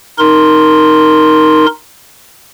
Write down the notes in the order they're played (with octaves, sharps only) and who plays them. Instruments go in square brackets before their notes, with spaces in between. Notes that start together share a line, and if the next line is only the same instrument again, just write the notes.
[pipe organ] D#4 A#4 C6